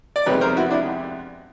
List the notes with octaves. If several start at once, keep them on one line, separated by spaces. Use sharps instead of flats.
D5
F2 C3 D#3 G#3 B3 B4 C#5
A#4 C5
E4 F#4
D4 E4